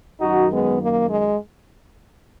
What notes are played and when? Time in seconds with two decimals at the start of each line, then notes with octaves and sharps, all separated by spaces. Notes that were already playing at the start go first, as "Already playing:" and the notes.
0.20 F#2 D#3 F#3 D#4 F#4
0.50 G#3 B3
0.80 A#3
1.09 G#3